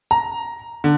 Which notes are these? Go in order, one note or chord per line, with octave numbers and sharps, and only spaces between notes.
A#5
D3